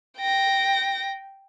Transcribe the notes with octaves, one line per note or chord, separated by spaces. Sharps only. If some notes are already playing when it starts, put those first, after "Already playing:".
G5 A#6